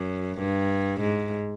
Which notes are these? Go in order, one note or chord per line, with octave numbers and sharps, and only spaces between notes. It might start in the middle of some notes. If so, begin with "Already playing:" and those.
Already playing: F#2
G2
G#2